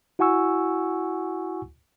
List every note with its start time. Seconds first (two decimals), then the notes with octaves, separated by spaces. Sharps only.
0.19 E4 F#4 F#5 G#5 C#6 E6